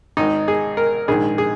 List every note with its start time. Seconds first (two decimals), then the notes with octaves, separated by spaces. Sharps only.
0.17 G#1 G#2 D#3 D#4
0.48 G#4
0.77 A#4
1.08 A#1 G#2 D#3 G#4
1.38 G#4